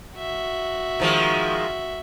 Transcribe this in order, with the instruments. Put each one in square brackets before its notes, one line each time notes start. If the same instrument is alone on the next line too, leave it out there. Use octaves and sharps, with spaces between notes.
[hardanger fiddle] F#4 E5
[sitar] D#3 F3 G#3